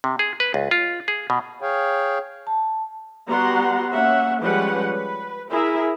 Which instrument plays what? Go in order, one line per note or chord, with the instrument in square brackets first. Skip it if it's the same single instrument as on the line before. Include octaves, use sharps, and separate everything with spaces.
[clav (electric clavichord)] C3
G#4
B4
C#2
F4
G#4
B2
[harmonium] G#4 C#5 F5 G5
[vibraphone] A5
[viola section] G3 B3 F#4 F#5 A#5 C6
A#3 C#4 E5 F#5
F3 G3 G#3 C#4 B4 F#5
B4
E4 G#4 A#4 E5